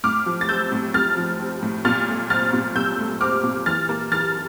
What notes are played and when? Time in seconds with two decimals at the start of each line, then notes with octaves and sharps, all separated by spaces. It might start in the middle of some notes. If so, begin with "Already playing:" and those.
0.04 A2 D6 F6
0.26 F3
0.41 A6
0.49 C4 E6 G6
0.72 A2
0.94 A2 F6 A6
1.17 F3
1.40 C4
1.62 A2
1.85 A#2 F6 A6
2.08 A3
2.30 C4 F6 A6
2.53 A#2
2.75 A#2 E6 G6
2.99 A3
3.21 C4 D6 F6
3.43 A#2
3.66 E3 F6 A6
3.89 A#3
4.11 E3 F6 A6